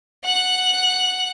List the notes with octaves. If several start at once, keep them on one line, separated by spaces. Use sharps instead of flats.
F#5 F#6